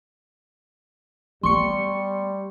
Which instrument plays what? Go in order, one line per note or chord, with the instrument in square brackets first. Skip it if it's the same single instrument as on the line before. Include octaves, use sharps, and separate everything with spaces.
[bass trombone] G3 [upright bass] A3 B3 [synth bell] C6 C#6 C#7